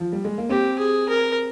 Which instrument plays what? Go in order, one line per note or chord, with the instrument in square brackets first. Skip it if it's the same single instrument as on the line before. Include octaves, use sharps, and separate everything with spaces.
[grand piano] F3
G3
G#3
A#3
[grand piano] C4 [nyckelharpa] G4
[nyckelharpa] G#4
A#4